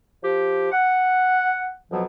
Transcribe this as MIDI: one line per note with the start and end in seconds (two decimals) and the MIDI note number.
0.23 0.67 53
0.23 0.67 67
0.72 1.73 78
1.91 2.03 41
1.91 2.03 47
1.91 2.03 53
1.91 2.03 54